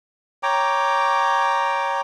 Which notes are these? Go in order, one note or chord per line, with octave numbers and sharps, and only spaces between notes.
C#5 G5 A#5 D6